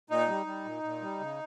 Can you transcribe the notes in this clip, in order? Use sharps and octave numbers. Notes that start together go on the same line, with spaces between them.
A#2 D#4
G3
G3
A#2
A#2
G3
C#3